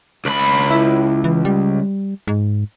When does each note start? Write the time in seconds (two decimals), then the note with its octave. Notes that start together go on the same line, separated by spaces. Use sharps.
0.25 C#2 B5
0.70 E4
1.24 E3
1.45 G3
2.27 G#2